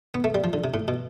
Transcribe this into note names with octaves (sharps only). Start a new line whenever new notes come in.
B3
A3
G3
F3
D3
C3
A2
B2